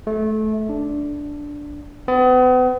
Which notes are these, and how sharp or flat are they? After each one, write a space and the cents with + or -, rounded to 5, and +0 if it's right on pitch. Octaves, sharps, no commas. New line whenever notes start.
A3 -25
D4 -5
B3 +40